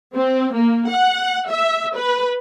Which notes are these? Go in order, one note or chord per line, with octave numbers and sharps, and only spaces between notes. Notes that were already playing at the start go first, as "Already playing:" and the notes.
C4
A#3
F#5
E5
B4